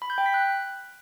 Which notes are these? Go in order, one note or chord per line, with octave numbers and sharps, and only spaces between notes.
B5
G6
G5
B6
F#6